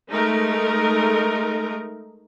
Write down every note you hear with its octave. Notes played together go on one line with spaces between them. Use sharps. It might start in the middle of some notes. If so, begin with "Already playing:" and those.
G#3 A3 D#4 A#4